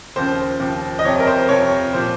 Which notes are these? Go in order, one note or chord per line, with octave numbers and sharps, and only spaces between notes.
D#2 C#3 F3 C5
D#2 C#3 F3
D#5
F2 C3 F3 C#5
A#4
C5
F2 C3 F3 C#5
A#2 F3 C5